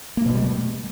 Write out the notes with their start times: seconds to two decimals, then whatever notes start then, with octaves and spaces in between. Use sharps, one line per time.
0.17 A#3
0.26 B2
0.34 G3
0.42 A3